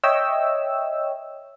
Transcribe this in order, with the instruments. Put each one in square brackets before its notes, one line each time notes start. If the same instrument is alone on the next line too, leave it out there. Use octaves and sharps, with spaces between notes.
[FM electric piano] C#5 D#5 E5 G5 E6